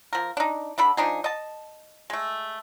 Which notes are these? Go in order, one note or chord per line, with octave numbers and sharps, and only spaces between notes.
F3 A#4
D4 D#4
D3 D4 A4 B5
F3 D4 D#4 G#4
D#5 A5
G#3 A3